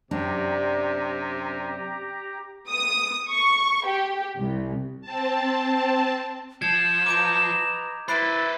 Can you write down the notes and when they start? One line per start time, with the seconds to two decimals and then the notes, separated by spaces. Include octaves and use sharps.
0.11 F#2 C3 D4 G4 A#5
2.69 D#6
3.30 C#6
3.86 G4
4.39 C2
5.01 C4 A5
6.62 F3 G#6 E7
7.06 B4 D#5 A#5 D6 G6 D7
8.08 E4 B4 C5 B5 F#6 A6 D7